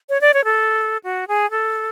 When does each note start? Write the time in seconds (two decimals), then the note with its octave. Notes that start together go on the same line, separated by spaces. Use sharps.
0.09 C#5
0.21 D5
0.34 C#5
0.45 A4
1.04 F#4
1.28 G#4
1.51 A4